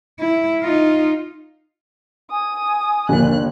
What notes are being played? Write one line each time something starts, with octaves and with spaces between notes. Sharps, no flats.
E4
D#4 F4
G#5 D#6
G1 D#2 F3 A#3 F#6